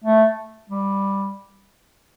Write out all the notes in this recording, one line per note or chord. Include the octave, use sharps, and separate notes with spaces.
A3
G3